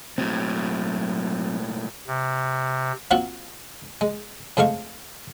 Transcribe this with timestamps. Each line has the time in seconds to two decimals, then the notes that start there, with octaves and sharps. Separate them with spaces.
0.18 B1 A2 F#3 C4
2.08 C3
3.11 A#3 C4 F4 F#4 F#5
4.01 G#3
4.57 F2 G#3 A3 F5 C#6